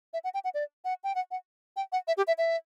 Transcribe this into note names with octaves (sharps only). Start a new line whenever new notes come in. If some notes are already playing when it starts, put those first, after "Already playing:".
E5
F#5
G5
F#5
D5
F#5
G5
F#5
F#5
G5
F#5
E5
G4
E5
E5